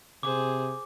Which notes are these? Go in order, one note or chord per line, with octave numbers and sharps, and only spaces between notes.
C3 G#4 C5 D6